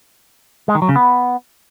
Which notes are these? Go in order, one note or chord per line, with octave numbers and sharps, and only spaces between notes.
G#3
D#3
F#3
C#3
B3